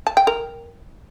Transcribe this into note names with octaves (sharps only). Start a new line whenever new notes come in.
A5
G5
A#4